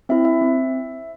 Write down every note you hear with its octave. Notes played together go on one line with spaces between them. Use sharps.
C4 E4 E5
E5
C4